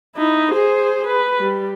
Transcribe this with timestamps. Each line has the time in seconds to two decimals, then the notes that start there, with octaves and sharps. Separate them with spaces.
0.16 D#4 E4
0.52 G#4 C5
1.07 B4
1.39 G3